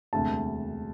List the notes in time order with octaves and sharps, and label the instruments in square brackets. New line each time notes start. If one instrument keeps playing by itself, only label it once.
[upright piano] E1 D2 C3 [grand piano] A5